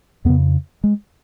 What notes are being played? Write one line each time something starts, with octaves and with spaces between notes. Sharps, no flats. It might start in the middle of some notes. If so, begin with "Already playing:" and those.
F2 C#3 B3
G#3